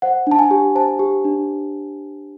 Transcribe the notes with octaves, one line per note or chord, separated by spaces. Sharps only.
C5 F#5
D4 A5
G#5
G4
C5 A5
G4
D4